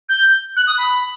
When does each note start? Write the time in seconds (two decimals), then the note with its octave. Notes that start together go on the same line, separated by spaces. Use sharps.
0.09 G6
0.56 F#6
0.66 D#6
0.77 B5